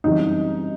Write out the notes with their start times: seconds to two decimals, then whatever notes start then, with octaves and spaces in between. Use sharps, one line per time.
0.04 F#2 C#3 E3 G3 C4 D#4